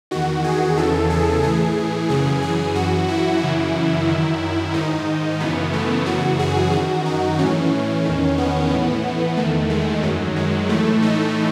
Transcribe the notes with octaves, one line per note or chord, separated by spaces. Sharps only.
E2 D#3 F#4
G#4
E2 C#3 E3 A4
G#4
A2 E3 G#4
F#2 C#3 E3 G#4
G#4
F#2 E3 F#4
E4
F#2 C#3 E3
F#2 D#3
G#2 D#3 D#4
F#2 C#3 E3 B3
A3
F#2 C#3 E3 F#4
G#4
F#2 D#3 F#4
D#4
A2 E3 C#4
E2 D#3
B3
A2 E3
E2 D#3 A3
G#3
F#2 D#3 F#3
G#3
A2 E3 A3
D#4